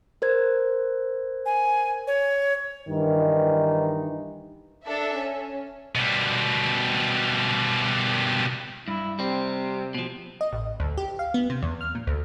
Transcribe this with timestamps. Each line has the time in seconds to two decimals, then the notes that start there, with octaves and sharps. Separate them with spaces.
0.22 A#4 C5 G#6
1.46 G#5
2.07 C#5
2.89 G2 D#3 E3 D#4
4.84 D4 A4 E5
5.16 C#4
5.95 B2 G3
8.88 G2 E4
9.19 C3 G3 C4
9.94 B2 F3
10.41 D#5
10.53 A1
10.80 D2
10.98 G4
11.19 F5
11.34 B3
11.50 C3
11.63 E2
11.81 F6
11.95 A#2
12.07 D2